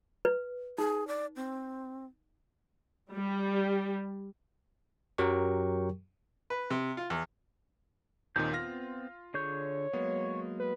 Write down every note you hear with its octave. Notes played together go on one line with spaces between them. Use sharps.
B4
D#4 G#4
D5
C4
G3
F#2 F#3 G4 A#4 G5 C#6
B4
C3
F4
E2
D#2 A#2 D#3 C4 G6
B3 C4 F4 F6 A#6
D3 G#4 C#5 G6
F#3 G#3 A#3 B3
B4